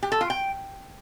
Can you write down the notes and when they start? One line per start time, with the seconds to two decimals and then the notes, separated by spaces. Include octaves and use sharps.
0.03 G4
0.12 A4
0.21 F4
0.30 G5